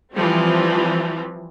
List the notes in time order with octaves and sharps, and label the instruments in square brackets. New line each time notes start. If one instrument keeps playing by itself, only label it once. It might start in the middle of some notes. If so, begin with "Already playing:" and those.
[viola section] E3 F3 G3 C4